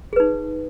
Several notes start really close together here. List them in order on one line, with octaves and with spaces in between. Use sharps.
G#4 B4 D#4